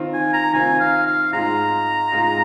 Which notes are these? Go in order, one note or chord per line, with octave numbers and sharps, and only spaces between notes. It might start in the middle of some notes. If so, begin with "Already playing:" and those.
Already playing: D#3 C4 F4
G#5
A#5
D#3 C4 F4 G#5
F5
F5
G#2 G#3 F4 A#5
G#2 G#3 F4